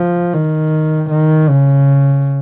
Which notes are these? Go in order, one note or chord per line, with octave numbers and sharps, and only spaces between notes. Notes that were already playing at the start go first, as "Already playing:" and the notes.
Already playing: F3
D#3
D#3
C#3